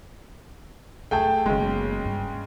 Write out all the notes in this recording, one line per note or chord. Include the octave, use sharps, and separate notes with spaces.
B1 E2 A3 G#4 G5 A5
F#1 C#3 G#3 B3
G2